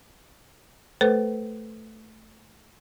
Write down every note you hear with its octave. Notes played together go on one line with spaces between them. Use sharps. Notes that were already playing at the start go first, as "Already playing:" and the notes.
A3 A4 B4 C5